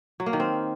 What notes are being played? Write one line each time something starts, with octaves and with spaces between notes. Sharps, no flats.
F#3
A#3
D#3
C4